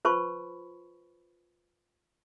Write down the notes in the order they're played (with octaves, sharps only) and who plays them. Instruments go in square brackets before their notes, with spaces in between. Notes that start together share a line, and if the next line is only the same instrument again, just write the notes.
[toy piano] F4 B4 C5 A5 B5 C#6